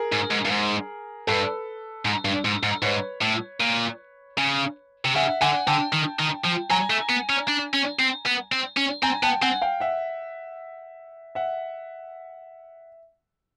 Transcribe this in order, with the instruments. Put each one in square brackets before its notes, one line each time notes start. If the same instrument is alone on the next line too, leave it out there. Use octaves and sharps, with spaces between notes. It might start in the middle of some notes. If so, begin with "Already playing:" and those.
Already playing: [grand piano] G#4 A#4
[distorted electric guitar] G#2
G#2
G2
G#2
[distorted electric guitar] G2 [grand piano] A4 B4
[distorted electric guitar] G#2
G2
G#2
G#2
[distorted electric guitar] G#2 [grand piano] B4 C#5
[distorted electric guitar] A2
A#2
C#3
C3
[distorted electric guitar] C#3 [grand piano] E5 F#5
[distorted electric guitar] D3 [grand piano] F#5 G#5
[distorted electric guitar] D3 [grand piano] G5 A5
[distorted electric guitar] D#3
D#3
F3
[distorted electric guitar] F#3 [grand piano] G#5 A#5
[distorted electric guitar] A3
B3
C#4
D4
C#4
C4
B3
C4
C#4
[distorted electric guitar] C4 [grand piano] G#5 A#5
[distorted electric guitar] B3 [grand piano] G5 A5
[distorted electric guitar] C4 [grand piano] F#5 G#5
[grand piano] F5 G5
E5 F#5
E5 F#5